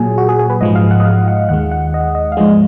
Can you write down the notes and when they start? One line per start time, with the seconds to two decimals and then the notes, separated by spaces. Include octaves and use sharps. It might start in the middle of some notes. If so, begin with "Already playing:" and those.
Already playing: A#2 F#3 G#4
0.18 F#4
0.29 G#4
0.39 G#4
0.50 B4
0.61 G#2 F3 G#3 D#5
0.75 F5
0.91 F#5
1.00 D#5
1.05 F5
1.28 F#5
1.49 D#2 D#3 G#3 F#5
1.72 F#5
1.94 D#5
2.15 D#5
2.32 F5
2.37 G#2 F3 G#3 D#5